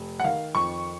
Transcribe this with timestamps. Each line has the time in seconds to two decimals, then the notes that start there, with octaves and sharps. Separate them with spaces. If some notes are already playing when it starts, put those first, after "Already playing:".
Already playing: F1
0.20 F#5
0.24 D#3 F5
0.55 F2 C#6